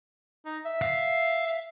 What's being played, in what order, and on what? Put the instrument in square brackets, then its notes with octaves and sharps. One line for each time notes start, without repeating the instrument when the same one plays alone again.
[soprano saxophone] D#4
E5
[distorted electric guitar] F5